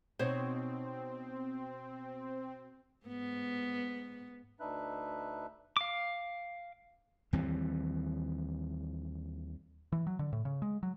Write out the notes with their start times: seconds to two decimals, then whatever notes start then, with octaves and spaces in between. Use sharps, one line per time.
0.19 B2 C4 D#4 C5 C#5
3.06 G#2 B3
4.60 D2 D4 D#4 B4 E5 F#6
5.77 F5 D6
7.33 D#2 E3 G3 C4
9.92 E3
10.07 F#3
10.19 D3
10.33 A2
10.45 C#3
10.62 G#3
10.83 F#3